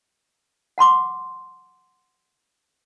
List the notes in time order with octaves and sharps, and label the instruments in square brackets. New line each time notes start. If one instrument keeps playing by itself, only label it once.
[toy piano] F#5 A5 C6 D6